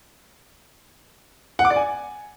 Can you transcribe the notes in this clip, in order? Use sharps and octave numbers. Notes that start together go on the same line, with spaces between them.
F#5
D6
D5
G#5